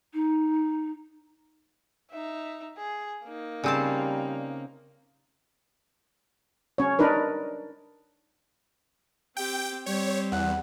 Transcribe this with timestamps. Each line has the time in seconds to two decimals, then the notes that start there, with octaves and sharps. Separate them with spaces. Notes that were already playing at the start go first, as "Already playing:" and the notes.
0.14 D#4
2.11 D#4 E5
2.77 G#4
3.24 A#3 D#4
3.64 C#3 G3 C4 A5
6.78 C#4 C#5
6.99 D4 D#4 A#4 B4
9.37 C4 G4 G5
9.86 G3 C4 G4 C#5
10.32 E2 F#5